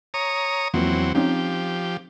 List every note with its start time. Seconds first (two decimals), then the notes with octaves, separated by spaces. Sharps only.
0.14 C#5 A#5 D#6
0.74 E2 F3 F#3 A#3 C4
1.15 F3 C4 C#4 D#4 G4